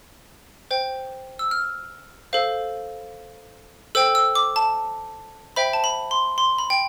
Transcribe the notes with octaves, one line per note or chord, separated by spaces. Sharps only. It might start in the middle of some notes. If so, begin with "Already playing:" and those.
C5 G5
E6
F6
A4 C5 F5
A4 C5 G5 E6
E6
D6
A5
C5 E5 G5 B5
A5
B5
C6
C6
B5
G5